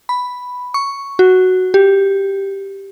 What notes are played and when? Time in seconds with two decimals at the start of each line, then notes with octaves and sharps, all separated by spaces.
0.09 B5
0.74 C#6
1.19 F#4
1.74 G4